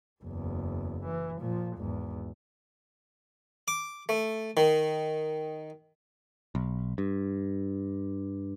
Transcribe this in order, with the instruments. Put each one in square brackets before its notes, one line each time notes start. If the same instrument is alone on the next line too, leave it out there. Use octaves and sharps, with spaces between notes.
[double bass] F#1 E2
E3
A#2 F3
G#1 E2
[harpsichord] D6
A3
D#3
[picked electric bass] B1
G2